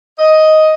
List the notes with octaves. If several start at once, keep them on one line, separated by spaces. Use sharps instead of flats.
D#5